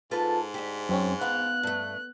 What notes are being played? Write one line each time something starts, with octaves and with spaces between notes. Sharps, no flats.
G#2 F4 A4 B4
D2 G4
F#2 C4 C#4
B3 F5 F#6
G2 A3